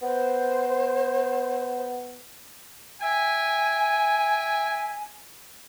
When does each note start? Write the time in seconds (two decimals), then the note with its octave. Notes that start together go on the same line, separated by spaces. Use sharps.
0.02 B3 C5
3.00 E5 G5 G#5